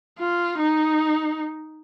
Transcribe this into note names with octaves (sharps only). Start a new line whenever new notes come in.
F4
D#4